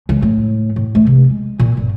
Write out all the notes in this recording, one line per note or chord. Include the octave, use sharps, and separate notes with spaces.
C#2
A2
A2
A3
C3
G#3
A#2
G1